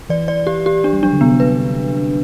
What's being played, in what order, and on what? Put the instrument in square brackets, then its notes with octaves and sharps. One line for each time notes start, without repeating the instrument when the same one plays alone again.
[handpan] E3 [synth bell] D5
[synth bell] D5
G4
G4
D4
[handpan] G3
[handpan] F#3 [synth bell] D4
[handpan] D3
[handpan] C3 [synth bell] B3
[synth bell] B4